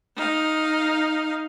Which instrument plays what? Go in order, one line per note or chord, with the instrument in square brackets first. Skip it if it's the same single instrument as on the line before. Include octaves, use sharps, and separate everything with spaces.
[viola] D#4 F5